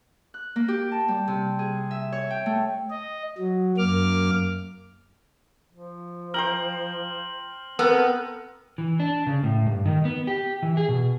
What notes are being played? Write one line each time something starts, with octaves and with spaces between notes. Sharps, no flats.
F#6
A#3
G4
A5
G3
C3
G#4
E5
C#5
G5
A3
D#5
F#3
F#2 A#3 D6 F6
F3
C5 G5 A#5 F6 F#7
B3 C4 A4 A#4
E3
D4
C#3
A2
G2
D#3
B3
G4
E3
G#4
B2